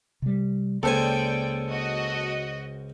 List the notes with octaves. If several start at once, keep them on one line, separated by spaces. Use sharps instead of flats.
C3 G3
C#2 A#3 A4 C5 D5 G5 G#5
F#4 D#5